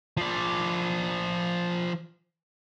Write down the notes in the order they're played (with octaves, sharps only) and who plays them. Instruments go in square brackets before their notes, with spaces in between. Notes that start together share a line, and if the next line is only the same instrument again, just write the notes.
[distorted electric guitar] F3 D5